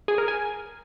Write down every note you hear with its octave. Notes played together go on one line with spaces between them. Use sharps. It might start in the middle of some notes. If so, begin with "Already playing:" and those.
G#4
A#4
G#5